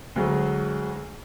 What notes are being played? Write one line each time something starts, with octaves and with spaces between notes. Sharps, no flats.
D2 F#3 G#3